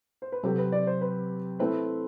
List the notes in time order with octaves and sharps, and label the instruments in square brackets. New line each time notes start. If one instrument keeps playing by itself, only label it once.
[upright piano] C5
B4
[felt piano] C3 F#3 C4 G4 [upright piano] A4
[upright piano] B4
D5
C5
B4
[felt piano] A3 C4 E4 [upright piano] B4